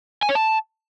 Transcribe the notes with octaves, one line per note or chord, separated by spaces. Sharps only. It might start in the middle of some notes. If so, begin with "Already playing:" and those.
G#5
C#5
A5